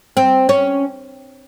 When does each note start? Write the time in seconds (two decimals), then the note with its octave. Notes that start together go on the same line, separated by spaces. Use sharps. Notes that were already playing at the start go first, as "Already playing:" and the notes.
0.17 C4
0.49 C#4